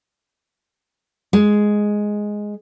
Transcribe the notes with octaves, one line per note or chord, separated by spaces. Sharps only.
G#3